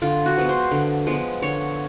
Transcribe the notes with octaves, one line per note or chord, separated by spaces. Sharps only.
D3 F4
F#4
F3 G#3 B3
C5
D3
F3 G#3 B3
D3 C#5